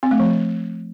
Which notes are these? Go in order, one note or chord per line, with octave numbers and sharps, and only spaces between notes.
C4
A3
F3